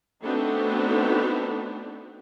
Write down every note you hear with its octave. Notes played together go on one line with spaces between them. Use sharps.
A3 B3 C4 D4 D#4 F#4